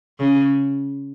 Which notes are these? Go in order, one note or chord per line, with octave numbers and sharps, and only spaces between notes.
C#3